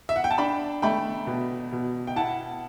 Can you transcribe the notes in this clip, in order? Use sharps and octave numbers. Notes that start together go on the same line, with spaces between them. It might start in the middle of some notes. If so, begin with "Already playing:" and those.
E5
F#5
G5
A5
D4 G5 B5
A3 G5 B5
B2
B2
G5
E4 F#5 A5